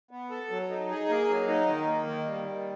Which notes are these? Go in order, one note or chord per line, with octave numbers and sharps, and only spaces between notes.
B3
A4
F#3
D#4
G#4
A#3
F#3
D#4
D#3
A#3
D#3
G3
D#3